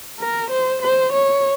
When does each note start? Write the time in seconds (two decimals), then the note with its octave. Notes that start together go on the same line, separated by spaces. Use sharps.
0.20 A#4
0.51 C5
0.82 C5
1.12 C#5